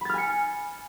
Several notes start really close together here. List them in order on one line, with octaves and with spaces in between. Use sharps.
B5 A6 F6 G#5 C#7